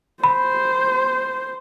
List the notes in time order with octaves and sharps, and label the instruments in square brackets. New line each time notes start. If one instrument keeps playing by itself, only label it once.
[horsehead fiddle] C5 [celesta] B5